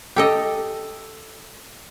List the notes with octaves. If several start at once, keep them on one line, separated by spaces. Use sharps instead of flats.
G4 A4 D#5